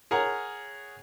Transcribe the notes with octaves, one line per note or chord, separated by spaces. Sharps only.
G#4 A#4 C#5 F#5 A#5